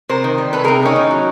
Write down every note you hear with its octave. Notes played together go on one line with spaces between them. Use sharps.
C3 A#4 C5
D#3
G3
C3 A4 B4
C3 G#4 A#4
D#3 C#4 D#4
A2
F#3